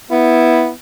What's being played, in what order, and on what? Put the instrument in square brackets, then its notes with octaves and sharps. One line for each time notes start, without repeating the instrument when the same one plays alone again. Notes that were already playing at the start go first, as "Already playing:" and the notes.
[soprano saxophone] B3 [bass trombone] E4